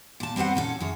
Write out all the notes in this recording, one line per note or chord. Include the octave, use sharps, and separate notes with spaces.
A#2 A5
G3 C4 B4 C5 F#5
A#2 C#4 A4
F#2 G#4 C#5